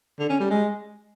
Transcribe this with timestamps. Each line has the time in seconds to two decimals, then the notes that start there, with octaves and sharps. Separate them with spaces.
0.19 D3
0.29 C#4
0.40 G3
0.50 G#3